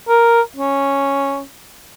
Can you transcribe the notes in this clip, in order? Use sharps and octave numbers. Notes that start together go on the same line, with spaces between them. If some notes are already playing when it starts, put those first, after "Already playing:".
A#4
C#4